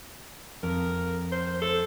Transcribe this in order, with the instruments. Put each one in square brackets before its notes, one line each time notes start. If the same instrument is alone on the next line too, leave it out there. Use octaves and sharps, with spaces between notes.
[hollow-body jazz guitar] F2 [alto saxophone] A#4
[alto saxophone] C5
A4